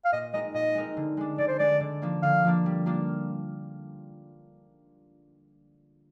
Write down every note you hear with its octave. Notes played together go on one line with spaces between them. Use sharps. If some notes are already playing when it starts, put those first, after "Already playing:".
F5
A#2 D#5
G#3 C4 D#4 A#4 D#5
A#2 D#5
G#3 C4 D#4 A#4
D3
G#3 D4
D3 D5
C5
G#3 D4 D5
D3
F3 A#3 D4
D3 F5
F3 A#3 D4
G3
A#3 D4 F4